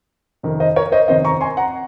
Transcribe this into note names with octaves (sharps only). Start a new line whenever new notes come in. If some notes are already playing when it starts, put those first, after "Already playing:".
F2 C3 D#3
C5 D#5
A#4 C#5
C5 D#5
F2 C3 D#3 C5 D#5
A#5 C#6
G#5 C6
F#5 A#5